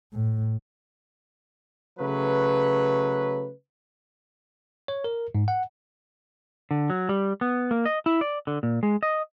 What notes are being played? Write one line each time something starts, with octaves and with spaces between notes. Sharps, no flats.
A2
C#3 F#3 A3 B4
C#5
A#4
G#2
F#5
D3
F#3
G3
B3
A#3
D#5
E4
D5
D3
A#2
G#3
D#5